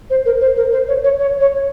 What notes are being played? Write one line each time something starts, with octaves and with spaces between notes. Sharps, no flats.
C5
A#4
C5
A#4
C5
C#5
C#5
C#5
C#5